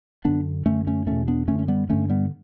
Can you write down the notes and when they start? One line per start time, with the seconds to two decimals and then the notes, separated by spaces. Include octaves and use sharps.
0.25 F#2 D3 B3 D4
0.66 F#2 D3 A3 C#4
0.87 A3 C#4
1.06 E2 B2 A3 C#4
1.28 B3 D4
1.48 F#2 A3 C#4
1.51 D3
1.59 C#4
1.68 G3 B3
1.89 G2 D3 A3 C#4
2.09 G3 B3